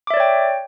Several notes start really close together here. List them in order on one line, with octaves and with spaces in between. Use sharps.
D6 E5 D5 C#5 G5